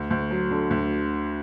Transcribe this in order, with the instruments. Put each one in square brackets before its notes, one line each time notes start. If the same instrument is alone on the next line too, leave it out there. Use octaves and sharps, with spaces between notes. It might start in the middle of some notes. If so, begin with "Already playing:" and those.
Already playing: [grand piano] D2
D2
F#3
D3
D2